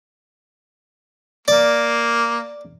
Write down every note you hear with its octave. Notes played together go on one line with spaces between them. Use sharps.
A#3 D5